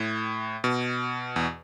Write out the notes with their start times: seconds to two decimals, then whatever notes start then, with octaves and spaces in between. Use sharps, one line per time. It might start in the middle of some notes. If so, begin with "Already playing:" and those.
Already playing: A2
0.64 B2
1.36 E2